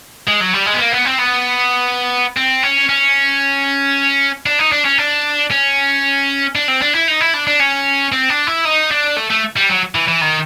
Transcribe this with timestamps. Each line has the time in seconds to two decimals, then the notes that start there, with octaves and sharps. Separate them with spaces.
0.27 G#3
0.40 F#3
0.54 G3
0.66 G#3
0.75 B3
0.80 A#3
0.93 B3
1.06 C4
1.19 B3
2.37 C4
2.63 C#4
2.89 C#4
4.46 D4
4.59 D#4
4.72 D4
4.85 C#4
4.98 D4
5.51 C#4
6.55 D4
6.68 C4
6.82 D4
6.94 E4
7.08 D#4
7.21 E4
7.34 D4
7.47 D4
7.60 C#4
8.12 C4
8.29 D4
8.47 E4
8.65 D#4
8.91 D4
9.16 A3
9.30 A3
9.56 G3
9.69 F#3
9.95 E3
10.08 E3
10.21 D#3